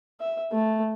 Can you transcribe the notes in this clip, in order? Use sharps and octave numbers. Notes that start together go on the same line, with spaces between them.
E5
A3